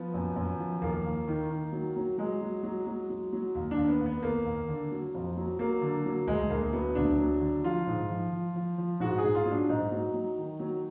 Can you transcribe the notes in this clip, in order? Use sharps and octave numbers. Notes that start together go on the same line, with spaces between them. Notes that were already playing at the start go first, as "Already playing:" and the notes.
Already playing: F3 B3
F#2
F#2
F3
D#2 A#3
D#2
D#3
D#3
F#3
F#3
F#3 G#3
F#3
F#3
F#3
F#3
F#3
D#2
D4
D#2
B3
D#2
B3
D#2 A#3
D#2
D3
F#3
F2
F#3
F#3 A#3
D3
F#3
D2 G#3
D2 A#3
F#3 B3
D2 D4
F#3
D3
F3 F4
G#2
F3
F3
F3
F3
G#2 F#4
G#4
G#2
F4
F#3
D4
G#2 D#4
F#3
F#3
D#3
F#3